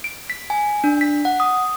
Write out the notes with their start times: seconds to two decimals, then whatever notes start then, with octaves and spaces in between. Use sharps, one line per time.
0.04 D7
0.30 B6
0.50 G#5
0.84 D4
1.01 B6
1.25 F#5
1.40 D#6